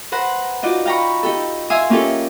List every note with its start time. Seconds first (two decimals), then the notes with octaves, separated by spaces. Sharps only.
0.12 B4 C5 F#5 A#5
0.63 D#4 F4 F#4 D5
0.85 F5 G5 A#5 B5 C#6
1.23 D#4 G4 A4
1.70 E5 F5 G#5 C6 D#6 E6
1.90 A#3 C#4 F4 G4 A4